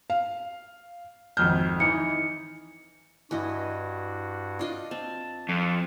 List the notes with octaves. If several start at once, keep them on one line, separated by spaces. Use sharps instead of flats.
F5
G#1 F2 F6 G6
E3 D#4 C#7
G2 E3 F#4 D#5
D4 F4 D#5
C4 A5
F2